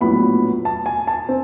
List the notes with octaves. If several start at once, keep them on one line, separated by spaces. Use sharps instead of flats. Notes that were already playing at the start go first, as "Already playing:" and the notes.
A#1 A2 F#3 B3 B5
A5
G#5
A5
C4